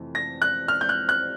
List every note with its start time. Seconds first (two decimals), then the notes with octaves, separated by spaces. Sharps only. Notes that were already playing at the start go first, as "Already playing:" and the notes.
Already playing: F2 C3 E3 A3
0.15 A#6
0.42 F#6
0.68 F6
0.81 G6
0.89 F#6
1.09 F#6